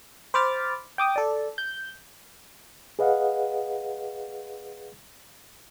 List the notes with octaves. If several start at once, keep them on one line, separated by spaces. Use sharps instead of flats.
C5 B5 D6 F6 A6
G5 D6 D#6
A4 D5
G6
G#4 B4 D#5 F5 F#5